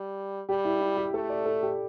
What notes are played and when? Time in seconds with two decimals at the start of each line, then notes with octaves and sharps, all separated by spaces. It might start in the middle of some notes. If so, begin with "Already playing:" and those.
Already playing: G3
0.49 G3 G4
0.65 E4
0.81 E4
0.97 G4
1.14 A3 A4
1.30 D5
1.46 A4
1.63 G4